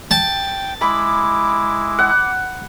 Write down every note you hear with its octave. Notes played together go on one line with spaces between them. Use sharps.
G5 A5
G#3 E4 B5 D6
F#5